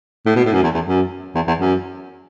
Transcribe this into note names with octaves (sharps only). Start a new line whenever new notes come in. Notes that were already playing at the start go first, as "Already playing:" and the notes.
A2
B2
A2
F#2
E2
E2
F#2
E2
E2
F#2